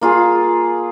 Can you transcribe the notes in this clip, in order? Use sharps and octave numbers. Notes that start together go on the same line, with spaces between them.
A#3 F4 G#4